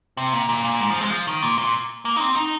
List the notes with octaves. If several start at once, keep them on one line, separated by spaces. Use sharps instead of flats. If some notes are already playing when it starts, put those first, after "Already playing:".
C3
A#2
A#2
A#2
G#2
F3
G#3
F3
D#3
A#2
A#2
A#3
D#4
C4
D#4